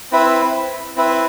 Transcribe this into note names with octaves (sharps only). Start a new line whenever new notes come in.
C4 E4 B4 E5
C4 E4 B4 E5